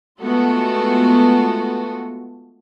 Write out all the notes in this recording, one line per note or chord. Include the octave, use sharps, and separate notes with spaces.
G#3 A3 B3 F4 F#4 A4